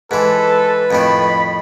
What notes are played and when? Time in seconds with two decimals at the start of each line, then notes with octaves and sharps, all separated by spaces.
0.11 G#2 E3 A4 B4
0.91 F2 A2 D#3 B5